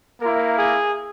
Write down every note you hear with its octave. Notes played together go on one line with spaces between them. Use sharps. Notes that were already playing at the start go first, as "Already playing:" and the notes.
A#3 E4 A#4
G#4